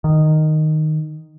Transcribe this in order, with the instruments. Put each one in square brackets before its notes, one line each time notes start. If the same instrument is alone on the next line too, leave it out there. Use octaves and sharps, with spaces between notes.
[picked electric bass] D#3